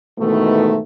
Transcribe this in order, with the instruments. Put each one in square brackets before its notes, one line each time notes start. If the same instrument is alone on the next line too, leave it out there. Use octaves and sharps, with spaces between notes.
[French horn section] G#2 B2 D#3 E3 A3